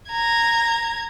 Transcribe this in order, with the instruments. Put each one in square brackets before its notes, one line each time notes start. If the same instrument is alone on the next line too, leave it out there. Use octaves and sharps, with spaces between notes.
[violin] A#5 G#6